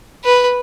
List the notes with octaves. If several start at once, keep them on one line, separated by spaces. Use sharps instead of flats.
B4